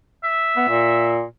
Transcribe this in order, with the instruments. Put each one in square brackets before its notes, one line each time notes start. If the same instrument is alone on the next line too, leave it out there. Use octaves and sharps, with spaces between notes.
[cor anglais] E5
[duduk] B3
A#2